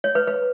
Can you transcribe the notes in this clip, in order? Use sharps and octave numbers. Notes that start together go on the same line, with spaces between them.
C#5
B4
B4